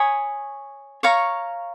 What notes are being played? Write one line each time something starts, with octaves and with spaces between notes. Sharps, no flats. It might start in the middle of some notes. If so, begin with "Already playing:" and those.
Already playing: C#5 G#5 B5 D#6
C#5 F5 A#5 C#6